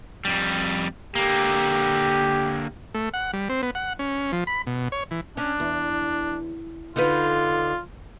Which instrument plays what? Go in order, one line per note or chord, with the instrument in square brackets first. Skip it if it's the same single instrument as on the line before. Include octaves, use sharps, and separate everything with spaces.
[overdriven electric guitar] F2 G3
[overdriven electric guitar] D3 A#3 [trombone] G4
[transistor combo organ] A3
F#5
G3
C4
B3
F#5
C#4
F3
B5
B2
C#5
E3
[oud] C#4 [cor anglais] D4
[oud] E2
[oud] D3 D#4 B4 [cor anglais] F4